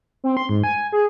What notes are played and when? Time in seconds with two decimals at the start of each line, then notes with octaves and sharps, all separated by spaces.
0.24 C4
0.37 C6
0.49 G#2
0.64 G#5
0.92 G#4